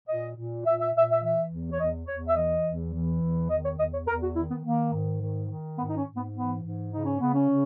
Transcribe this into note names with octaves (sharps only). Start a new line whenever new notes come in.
A#2 D#5
A#2
A#2 E5
E5
A#2 E5
E5
E3 E5
E2
C#5
E2 D#5
E2 C#5
E5
E3 D#5
E2
E3
E2
D#3 D#5
C#5
E2 D#5
C#5
E2 A#4
F#4
D#3 E4
B3
D#3 A#3
G#2
D#3
D#3
G#2 B3
D#4
C#4
G#2
B3
E3 B3
G#2
C#3 D#4
C#4
C#3 B3
C#4
C#3